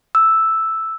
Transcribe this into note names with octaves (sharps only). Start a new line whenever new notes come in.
E6